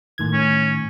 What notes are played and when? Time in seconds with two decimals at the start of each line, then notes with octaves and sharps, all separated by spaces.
0.18 A2 D#3 G#6
0.33 C#4